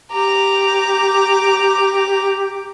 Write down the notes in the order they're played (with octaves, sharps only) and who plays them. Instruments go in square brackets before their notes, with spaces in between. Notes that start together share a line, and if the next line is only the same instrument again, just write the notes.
[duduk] G4 [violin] A#5 D6